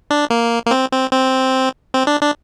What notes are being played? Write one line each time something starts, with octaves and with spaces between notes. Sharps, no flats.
D4
A#3
A#3
C4
C4
C4
C4
D4
D4